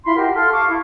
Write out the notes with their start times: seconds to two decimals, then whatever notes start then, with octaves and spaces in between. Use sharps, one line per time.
0.04 E4 F4 B5 C6
0.15 E4 F#4 G4 A#4
0.34 A4 F5 C6 F6
0.52 F5 A5 C#6 D6
0.67 E4